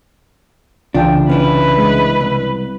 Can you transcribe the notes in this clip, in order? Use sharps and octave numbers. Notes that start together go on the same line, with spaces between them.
C2 C#3 E3 D4 F4 G5 A5
C#4 D4 E4 B4
G#3
C2